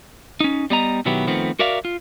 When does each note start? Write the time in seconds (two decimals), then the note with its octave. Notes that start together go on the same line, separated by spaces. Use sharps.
0.40 C#4 D#4
0.70 G3 B3 D#5 A#5
1.05 B2 D#3 F#3 B3 E4 G4
1.27 D#3 F3 A3 B3 C4
1.59 F#4 A#4 D5 E5 F5
1.85 F4